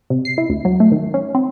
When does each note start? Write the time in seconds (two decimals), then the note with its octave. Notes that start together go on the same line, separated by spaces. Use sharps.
0.10 C3
0.25 C7
0.38 E4
0.50 D2
0.65 F#3
0.80 A3
0.92 D#3
1.14 C#4
1.35 C4